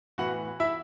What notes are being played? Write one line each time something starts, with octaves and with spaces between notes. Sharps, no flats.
A2 E3 B3 F#4 F#5
E4 E5